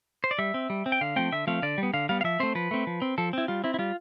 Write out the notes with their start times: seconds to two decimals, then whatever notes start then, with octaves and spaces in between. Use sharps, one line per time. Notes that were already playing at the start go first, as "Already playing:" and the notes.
0.24 C5
0.31 D5
0.39 G3 E5
0.54 C4
0.70 G3
0.86 C4
0.92 G5
1.01 D3 F5
1.16 F3 A3 C4 G5
1.32 D3 E5
1.47 F3 A3 C4 F5
1.62 D3 D5
1.78 G3
1.83 B3
1.93 D3 F5
2.09 G3 B3 F5
2.21 F5
2.24 F3 E5
2.40 A3 C4 C5
2.55 F3 B4
2.71 A3 C4
2.87 F3
3.02 C4
3.18 F3 A4
3.33 C4 E4
3.48 G3 F4
3.64 C4 E4
3.74 E4
3.79 G3 F4